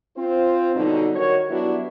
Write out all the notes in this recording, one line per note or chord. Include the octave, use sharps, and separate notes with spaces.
C4 F4 C5
B2 D3 F#3 G3 D#4
D#3 F#4 A#4 C#5
F#3 G3 B3 D4 E4 F#4